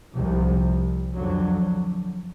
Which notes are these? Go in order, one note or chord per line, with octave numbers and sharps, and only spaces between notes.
C2 C3 F3
F2 D3 F#3